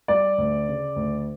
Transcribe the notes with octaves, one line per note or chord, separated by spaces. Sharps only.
G3 D5
D2
C#3
D2